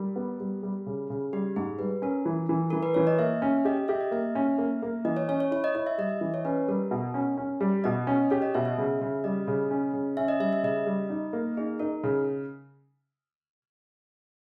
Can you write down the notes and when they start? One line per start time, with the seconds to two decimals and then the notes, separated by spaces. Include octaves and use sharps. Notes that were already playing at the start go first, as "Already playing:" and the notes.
Already playing: G3 A#4
0.16 B3
0.40 G3
0.63 G3
0.86 C#3
1.10 C#3
1.33 G3 G4
1.56 G#2 G#4
1.79 G3 B4
2.02 C#4 A#4
2.25 E3
2.49 E3
2.70 E3 A#4
2.83 B4
2.94 E3 C#5
3.07 D#5
3.19 A#3 E5
3.42 C#4
3.65 G4 D#5
3.88 G4 E5
4.01 D#5
4.11 A#3 E5
4.35 C#4
4.58 A#3
4.82 A#3
5.05 E3 D#5
5.17 C#5
5.28 C#4 C#5
5.40 C#5
5.51 E4 C#5
5.64 D#5
5.75 E4 D#5
5.87 E5
5.98 G3 D#5
6.10 E5
6.21 E3 D#5
6.34 C#5
6.45 C#4 B4
6.68 G3 A#4
6.91 B2
7.14 C#4
7.37 C#4
7.61 G3
7.84 B2 D#5
8.07 C#4
8.30 G4 C#5
8.42 D#5
8.54 B2 E5
8.65 E5
8.78 C#3
9.01 C#3
9.24 G3 D#5
9.47 C#3
9.71 C#4
9.93 C#3
10.17 C#4 E5
10.28 D#5
10.40 G3 E5
10.53 E5
10.63 C#3 D#5
10.86 G3
11.10 D#4
11.33 A#3
11.57 D#4 G#4
11.79 D#4 A#4
12.03 C#3